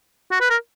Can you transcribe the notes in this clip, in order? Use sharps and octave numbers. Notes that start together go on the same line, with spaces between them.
F#4
B4
A#4